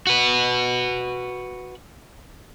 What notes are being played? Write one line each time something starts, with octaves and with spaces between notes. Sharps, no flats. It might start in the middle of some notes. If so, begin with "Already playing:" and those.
F#4 B4